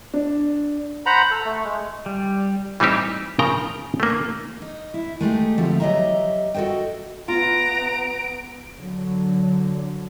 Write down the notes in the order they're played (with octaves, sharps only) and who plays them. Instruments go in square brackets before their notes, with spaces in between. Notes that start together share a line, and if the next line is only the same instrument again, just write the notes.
[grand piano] D4
[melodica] C5 F#5 A#5 B5
A4
A3
G#3
[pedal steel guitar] G3
[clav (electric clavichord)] E3 G3 C4 D#4 G4 C5
C#3 F3 A#4 G5 A#5
A3 A#3
[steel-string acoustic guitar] D#4
E4
G#3 A3 D#4 G4
D2 F3 A3 C4 G4
F#3 G4 D#5 E5 A#5
F#4 A4 C5 D#5 G5
[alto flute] B3 [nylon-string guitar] F4 [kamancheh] A#5 [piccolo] D7
[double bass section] D3 F#3